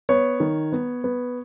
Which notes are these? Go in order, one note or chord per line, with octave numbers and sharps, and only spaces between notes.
B3 C#5
D#3
B3
B3